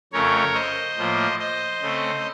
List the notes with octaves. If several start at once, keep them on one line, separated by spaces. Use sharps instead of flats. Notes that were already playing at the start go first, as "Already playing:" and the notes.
F2 C#3 A3 C#4 A#4 C#5
C5 D#5
A2 F3 A#3
C5 D#5
C#3 A3 C4